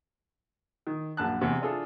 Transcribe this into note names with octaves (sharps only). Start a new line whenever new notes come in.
D#3
A#1 F#2 A5 F#6
E2 C3
D4 E4 F4 G#4 A4